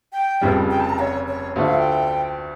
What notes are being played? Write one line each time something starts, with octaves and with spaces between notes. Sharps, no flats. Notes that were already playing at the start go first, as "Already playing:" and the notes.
G5
F1 F2 C#3 G3
G5
A5
A#5
C#5
C#5
D2 D3 A3 D4 F4
F5
G5